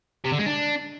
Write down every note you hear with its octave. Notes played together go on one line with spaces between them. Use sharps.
C3
D3
G#3
D4